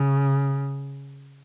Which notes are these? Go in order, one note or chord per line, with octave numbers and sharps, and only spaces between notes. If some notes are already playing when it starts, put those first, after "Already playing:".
Already playing: C#3